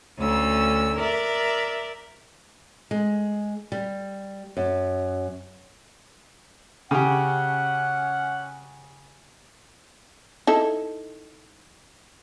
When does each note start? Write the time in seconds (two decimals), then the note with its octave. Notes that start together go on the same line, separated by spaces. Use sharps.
0.19 D2 C#4 E6
0.97 A#4 D5 E5
2.91 G#3
3.72 G3
4.57 F#2
6.91 C#3 C#4 G4 F#5
10.47 D#4 E4 A4